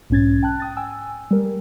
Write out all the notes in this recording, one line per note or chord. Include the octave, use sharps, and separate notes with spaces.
B1 G#2 C#4 G#6 A6
G5 A5 F#6
G5 D#6 A6
G5 G#5 E6
G3 A#4